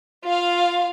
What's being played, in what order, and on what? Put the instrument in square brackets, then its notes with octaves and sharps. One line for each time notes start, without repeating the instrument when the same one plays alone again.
[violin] F4 F5